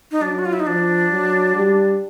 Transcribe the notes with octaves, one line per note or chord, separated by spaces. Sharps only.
D#4
F#3 D4
F#4
F4
E4
D#4
F3 D4
F#3
G3